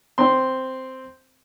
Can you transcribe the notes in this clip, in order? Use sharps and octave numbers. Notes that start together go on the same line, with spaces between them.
C4 C6